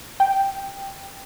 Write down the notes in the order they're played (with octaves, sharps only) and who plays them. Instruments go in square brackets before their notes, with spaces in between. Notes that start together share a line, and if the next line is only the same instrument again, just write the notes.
[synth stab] G5